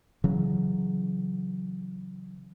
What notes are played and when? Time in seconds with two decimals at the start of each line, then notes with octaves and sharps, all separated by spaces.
0.24 C#3 E3 F#3